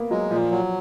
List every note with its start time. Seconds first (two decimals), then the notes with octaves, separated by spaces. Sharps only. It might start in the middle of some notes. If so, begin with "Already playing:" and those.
Already playing: A#3 B3
0.11 F#3 G#3
0.31 A#2 F3
0.51 F#3